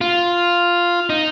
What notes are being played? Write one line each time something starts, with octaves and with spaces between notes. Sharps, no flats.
F4
D#4